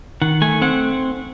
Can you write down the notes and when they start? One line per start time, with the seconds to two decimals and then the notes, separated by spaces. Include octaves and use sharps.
0.22 D#3 F#5
0.41 A3 G#5
0.62 C4 F#5